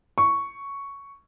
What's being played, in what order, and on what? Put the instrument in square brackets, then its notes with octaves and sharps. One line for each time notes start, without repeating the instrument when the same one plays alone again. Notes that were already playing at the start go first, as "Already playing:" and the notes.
[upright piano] C#6